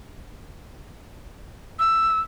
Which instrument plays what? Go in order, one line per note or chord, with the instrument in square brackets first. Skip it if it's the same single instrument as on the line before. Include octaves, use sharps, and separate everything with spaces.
[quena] E6